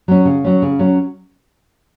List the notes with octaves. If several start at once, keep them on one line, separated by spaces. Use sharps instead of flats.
F#3 C#4
C#3
F#3 C#4
C#3
F#3 C#4